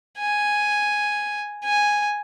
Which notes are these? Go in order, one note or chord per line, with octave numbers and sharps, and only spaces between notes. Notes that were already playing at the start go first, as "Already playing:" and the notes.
G#5
G#5